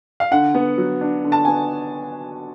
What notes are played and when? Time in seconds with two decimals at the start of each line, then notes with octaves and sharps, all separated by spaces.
0.20 F5
0.31 D3 F#5
0.54 B3
0.78 F#3
1.01 D4
1.24 D3
1.32 A5
1.45 B3 G#5